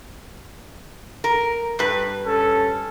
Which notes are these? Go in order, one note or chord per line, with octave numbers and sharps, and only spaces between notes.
A#4
G2 B4
C#4 A4